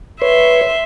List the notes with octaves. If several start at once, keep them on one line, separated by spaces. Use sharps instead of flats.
B4 C#5 E5 C6